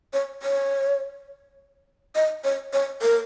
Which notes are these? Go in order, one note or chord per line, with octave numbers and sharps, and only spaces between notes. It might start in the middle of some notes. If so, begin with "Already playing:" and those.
C#5
C#5
D#5
C#5
C#5
A#4